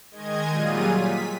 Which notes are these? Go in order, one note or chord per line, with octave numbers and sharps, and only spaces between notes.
D#3 G#3 D#5 G#6
A#2 F#3 G3 F4 G#4 D#7
B6